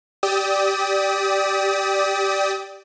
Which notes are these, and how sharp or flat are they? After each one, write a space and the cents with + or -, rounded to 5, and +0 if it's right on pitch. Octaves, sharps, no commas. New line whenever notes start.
G4 +0 D5 +0 D#6 +35